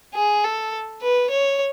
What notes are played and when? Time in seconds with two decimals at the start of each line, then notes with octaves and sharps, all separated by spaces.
0.15 G#4
0.44 A4
1.02 B4
1.30 C#5